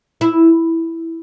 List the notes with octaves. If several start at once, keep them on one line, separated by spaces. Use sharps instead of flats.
E4